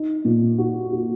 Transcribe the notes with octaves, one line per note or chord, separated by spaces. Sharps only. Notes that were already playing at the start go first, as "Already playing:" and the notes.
Already playing: D#4
A#2
F#4
F#4